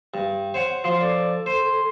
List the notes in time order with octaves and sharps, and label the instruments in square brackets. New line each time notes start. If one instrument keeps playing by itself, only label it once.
[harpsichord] G2
C5 C#5 F#5
[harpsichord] F3 [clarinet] C6
[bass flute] A4 [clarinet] D5
[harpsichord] C5 [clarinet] C6